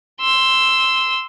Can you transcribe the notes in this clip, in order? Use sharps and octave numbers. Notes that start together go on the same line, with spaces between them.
C6 E6